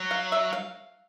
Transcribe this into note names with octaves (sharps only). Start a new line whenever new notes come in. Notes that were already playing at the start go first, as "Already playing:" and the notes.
Already playing: F#3
F5
E5
F5